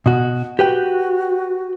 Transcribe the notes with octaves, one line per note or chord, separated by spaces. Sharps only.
B2 F#4
F#4 G4 B4 G5